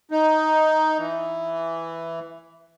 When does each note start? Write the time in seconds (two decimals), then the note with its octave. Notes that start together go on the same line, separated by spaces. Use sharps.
0.11 D#4
0.98 E3